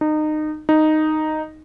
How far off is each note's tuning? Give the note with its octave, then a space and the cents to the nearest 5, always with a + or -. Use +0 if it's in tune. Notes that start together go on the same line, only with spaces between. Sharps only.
D#4 -25
D#4 -5